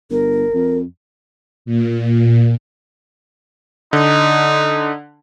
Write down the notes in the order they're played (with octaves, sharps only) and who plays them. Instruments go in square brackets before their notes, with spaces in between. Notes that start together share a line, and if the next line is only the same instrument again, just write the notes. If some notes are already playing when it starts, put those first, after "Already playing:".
[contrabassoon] G1 [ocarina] A#4
[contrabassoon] F2
[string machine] A#2
[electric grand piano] D3 [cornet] D#4